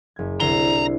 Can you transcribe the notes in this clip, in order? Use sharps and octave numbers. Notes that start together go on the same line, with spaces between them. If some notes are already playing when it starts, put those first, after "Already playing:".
F#1 G#6
C2 D3 E4 C5 A#5